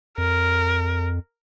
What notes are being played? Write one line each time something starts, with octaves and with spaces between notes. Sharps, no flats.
F2 A#4